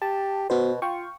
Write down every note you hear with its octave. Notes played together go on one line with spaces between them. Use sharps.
G4 A5
B2 B3 F#4 C5
F4 F5 G5 C#6